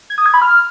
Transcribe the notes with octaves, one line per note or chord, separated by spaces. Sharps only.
G#6
D#6
G#6
B5
F6